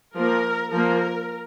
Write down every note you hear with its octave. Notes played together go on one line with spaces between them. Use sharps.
F3 A#3 A#4
F3 A#3 A#4